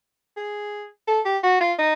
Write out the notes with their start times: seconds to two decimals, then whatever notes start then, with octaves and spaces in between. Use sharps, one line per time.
0.37 G#4
1.08 A4
1.25 G4
1.43 F#4
1.60 F4
1.79 D#4